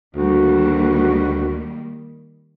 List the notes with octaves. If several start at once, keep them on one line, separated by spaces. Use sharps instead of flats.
D2 D#3 G3 A#3 F#4